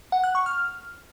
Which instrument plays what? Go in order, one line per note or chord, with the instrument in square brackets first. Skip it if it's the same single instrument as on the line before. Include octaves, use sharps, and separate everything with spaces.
[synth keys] F#5
F#6
C#6
F6